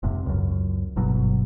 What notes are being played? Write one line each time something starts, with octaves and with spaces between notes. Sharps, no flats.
F1 G#2 C3
C#2 F#2
G1 B2 F#3